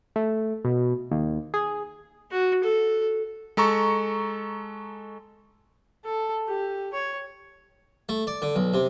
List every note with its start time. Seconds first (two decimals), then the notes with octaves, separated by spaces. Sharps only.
0.16 A3
0.65 B2
1.11 D#2
1.54 G#4
2.31 F#4
2.64 A4
3.57 G#3 A4 A#5 C#6
6.04 A4
6.47 G4
6.93 C#5
8.09 A3
8.27 D5
8.42 D3
8.56 B1
8.74 C3